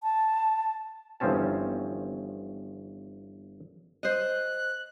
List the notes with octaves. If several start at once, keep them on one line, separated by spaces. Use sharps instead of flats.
A5
G1 E2 F3 C4 C#4 A5
C5 D#5 F#6